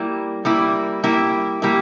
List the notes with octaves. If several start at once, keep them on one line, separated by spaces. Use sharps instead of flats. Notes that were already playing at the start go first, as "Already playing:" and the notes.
Already playing: G3 A#3 E4
G3 A#3 E4
G3 A#3 E4
G3 A#3 E4